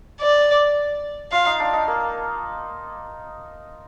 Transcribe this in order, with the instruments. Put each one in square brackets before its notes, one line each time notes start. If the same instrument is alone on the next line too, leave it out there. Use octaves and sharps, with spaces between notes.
[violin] D5
[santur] F4 [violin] F5
[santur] D#4
D4
D#4
A#3